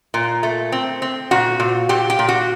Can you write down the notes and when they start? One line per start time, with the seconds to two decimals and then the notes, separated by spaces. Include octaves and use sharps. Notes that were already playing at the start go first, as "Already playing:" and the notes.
0.14 A#2
0.43 A3
0.72 C4
1.02 C4
1.31 A#2 F#4
1.60 A#2
1.89 A#2 G4
2.10 G4
2.19 A#2
2.29 F#4